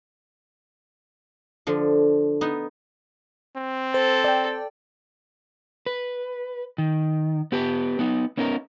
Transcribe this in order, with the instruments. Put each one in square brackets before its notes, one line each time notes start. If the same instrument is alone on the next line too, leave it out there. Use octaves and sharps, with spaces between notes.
[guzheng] D3 F3
B3 D#4
[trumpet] C4
[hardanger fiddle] A4 [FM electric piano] C5
[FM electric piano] D5 G5
[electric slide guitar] B4
D#3
B3 G4 B4
B3 D#4
B3 C#4 D#4 A#4